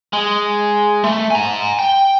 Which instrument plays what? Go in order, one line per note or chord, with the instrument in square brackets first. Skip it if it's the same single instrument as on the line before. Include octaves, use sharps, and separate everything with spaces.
[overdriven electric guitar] G#3
A3
G#5 A#5
G5